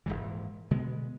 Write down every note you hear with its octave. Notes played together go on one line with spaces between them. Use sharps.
D#1 C#2 G#2 E3
B2 D3 G#3 B3